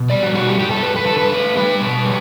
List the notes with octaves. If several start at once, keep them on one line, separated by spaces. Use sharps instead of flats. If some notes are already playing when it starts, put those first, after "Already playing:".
Already playing: B2
G3 D5
F#4
B2 F#4
G4
G2 G4
A4
G2 B4
B4
D3 A4
B4
A3
G3 B4
B2
G3